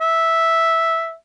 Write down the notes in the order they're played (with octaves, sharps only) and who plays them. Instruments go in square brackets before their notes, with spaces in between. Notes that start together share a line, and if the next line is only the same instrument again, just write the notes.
[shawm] E5